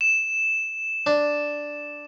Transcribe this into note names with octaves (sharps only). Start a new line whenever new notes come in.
E7
D4